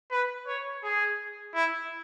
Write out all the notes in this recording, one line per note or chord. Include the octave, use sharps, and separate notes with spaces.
B4
C#5
G#4
E4